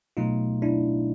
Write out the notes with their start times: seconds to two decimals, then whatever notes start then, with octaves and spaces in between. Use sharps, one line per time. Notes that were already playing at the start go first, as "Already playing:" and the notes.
0.17 B2 F#3 A3 D#4 F4
0.62 D4 E4